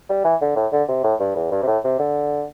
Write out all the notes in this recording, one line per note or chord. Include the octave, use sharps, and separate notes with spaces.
G3
E3
D3
A2
D3
C3
A2
G2
E2
G2
C3
A2
C3
D3